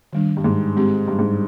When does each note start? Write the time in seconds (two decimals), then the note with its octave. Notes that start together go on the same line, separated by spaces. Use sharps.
0.13 D#3 G3 D4
0.37 G2
0.44 G#2
0.76 G#3 C4 G4
1.08 G2
1.19 G#2